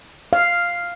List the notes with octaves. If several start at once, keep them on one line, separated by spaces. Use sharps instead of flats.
F5